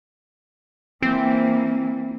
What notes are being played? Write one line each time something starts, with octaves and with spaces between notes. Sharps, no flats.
E3 A#3 C4